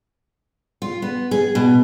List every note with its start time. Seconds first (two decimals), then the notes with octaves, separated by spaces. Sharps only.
0.82 F4
1.02 B3
1.31 G#4
1.55 B2